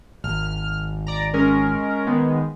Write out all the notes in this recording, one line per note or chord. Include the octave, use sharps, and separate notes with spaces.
G#1 F6
D5 A#5
G#3 C#4 A#4
D#3 G#3 B3